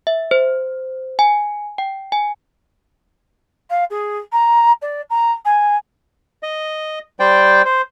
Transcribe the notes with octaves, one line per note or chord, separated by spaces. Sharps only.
E5
C5
G#5
G5
G#5
F5
G#4
A#5
D5
A#5
G#5
D#5
G3 C5 D5 G5
C5